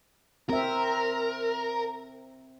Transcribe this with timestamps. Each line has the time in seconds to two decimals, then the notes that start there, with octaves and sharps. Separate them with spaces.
0.49 C4 A#4 E5